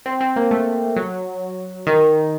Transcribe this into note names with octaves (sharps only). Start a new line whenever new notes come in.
C4
C4
A#3
A3
F#3
D#3